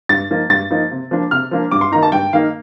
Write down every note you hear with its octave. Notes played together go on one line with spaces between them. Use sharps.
G2 A6
F3 A#3 D#4
G2 A6
F3 A#3 D#4
C3
F3 A#3 D4
C3 F6
F3 A#3 D4
G2 D6
C6
D#3 A#3 D#4 A#5
A5
G2 G5
D#3 A#3 D#4 F5